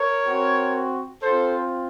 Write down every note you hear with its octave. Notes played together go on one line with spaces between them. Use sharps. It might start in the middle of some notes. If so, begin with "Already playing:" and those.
Already playing: A#4 C#5
C4 F#4
C4 F4 A4 C5